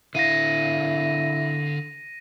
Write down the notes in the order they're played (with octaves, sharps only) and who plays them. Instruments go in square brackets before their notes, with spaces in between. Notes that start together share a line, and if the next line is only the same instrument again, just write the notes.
[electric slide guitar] D3 F5 [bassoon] E4 [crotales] A#6 D#7